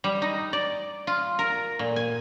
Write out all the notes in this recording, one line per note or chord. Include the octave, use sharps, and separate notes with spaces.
G3
D#4
D5
F4
A#4
A#2
G#5